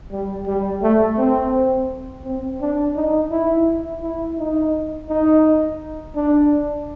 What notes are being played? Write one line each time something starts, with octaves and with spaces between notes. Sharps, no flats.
G3
G3
A3
C4
C4
D4
D#4
E4
E4
D#4
D#4
D4